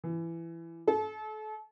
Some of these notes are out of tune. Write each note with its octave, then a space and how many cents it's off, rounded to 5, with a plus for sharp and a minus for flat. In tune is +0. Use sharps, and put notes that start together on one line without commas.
E3 +20
A4 -35